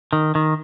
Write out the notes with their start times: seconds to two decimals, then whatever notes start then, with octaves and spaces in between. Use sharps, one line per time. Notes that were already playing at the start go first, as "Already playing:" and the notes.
0.13 D#3
0.35 D#3